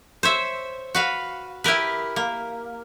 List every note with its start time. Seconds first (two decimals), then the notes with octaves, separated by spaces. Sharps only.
0.23 C5 C#5 E5
0.95 F#4 B4 F5
1.64 E4 G4 A#4 B4
2.16 A#3